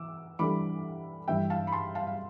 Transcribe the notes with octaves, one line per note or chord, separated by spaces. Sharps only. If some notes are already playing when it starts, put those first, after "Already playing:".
Already playing: E3 D6 E6
E3 G3 D4 A4 B5 D6
G2 E3 G3 E5 G5
F5 A5
B5
A5 C6
F5 A5
F5